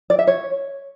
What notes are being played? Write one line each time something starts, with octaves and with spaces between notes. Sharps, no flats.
D5
E5
C#5